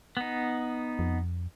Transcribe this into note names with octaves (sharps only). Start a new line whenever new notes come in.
B3 D#4
F2